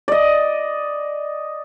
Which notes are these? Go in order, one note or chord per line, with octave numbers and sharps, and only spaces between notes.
D5 D#5